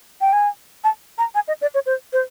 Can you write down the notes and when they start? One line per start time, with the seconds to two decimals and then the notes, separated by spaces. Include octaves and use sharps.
0.21 G5
0.33 G#5
0.84 A5
1.18 A#5
1.35 G#5
1.48 D#5
1.62 D5
1.74 C#5
1.86 C5
2.13 C5